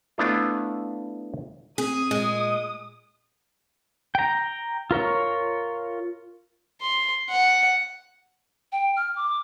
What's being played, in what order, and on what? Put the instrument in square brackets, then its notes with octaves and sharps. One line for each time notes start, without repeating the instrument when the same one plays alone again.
[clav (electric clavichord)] A3 B3 D4 E4 F4
[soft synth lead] C4 [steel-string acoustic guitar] G#4 [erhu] D#6
[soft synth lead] A#2 [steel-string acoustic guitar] G#3
[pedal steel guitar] G5 A#5
F4 A#4 C#5
[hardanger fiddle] C6
F#5
[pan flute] G5
F6
D6